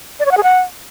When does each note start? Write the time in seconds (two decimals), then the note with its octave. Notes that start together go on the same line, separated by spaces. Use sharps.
0.19 D5
0.25 C#5
0.31 F#5
0.37 G#4
0.43 F#5